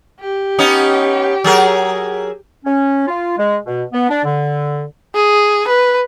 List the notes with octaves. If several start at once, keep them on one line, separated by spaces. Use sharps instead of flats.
G4
B3 C#4 D#4
F#3 G#4 A#4
C#4
F4
G#3
B2
B3
D4
D3
G#4
B4